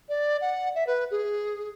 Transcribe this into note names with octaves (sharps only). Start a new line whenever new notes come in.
D5
F#5
E5
B4
G#4